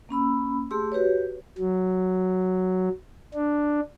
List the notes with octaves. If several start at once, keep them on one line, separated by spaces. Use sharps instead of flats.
A#3 C#4 B5 E6
A3 G4 G#4 C6 E6
F#4 G4 B4 C#5
F#3
D4